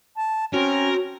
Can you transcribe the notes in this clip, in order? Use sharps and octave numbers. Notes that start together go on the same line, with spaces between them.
A5
C4 C#4 F#4 A#4